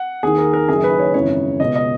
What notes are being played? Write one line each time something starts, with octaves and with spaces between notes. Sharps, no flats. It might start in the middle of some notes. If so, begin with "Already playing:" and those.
Already playing: F#5
D#2 D#3 G#4
A#4
A#4
F#1 F#2 D#3 G#4
B4
C#5
G#1 F#2 C#3 E3 C#5
C#2 B2 D#5
D#5